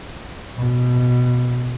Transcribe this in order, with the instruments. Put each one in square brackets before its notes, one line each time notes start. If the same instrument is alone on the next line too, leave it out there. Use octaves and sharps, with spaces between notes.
[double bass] B2